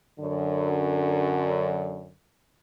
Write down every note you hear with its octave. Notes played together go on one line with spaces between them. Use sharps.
F#2 D3